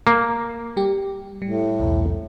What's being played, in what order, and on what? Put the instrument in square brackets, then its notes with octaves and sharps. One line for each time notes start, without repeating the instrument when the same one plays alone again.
[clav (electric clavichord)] A#3
[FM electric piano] G3 G4
[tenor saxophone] A2 [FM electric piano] G3
[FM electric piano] B1 E2